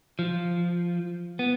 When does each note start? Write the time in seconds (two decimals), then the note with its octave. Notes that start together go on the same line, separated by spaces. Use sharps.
0.19 F3
1.39 B3